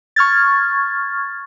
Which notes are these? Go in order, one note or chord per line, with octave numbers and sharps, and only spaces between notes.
C#6 F6 G#6 A6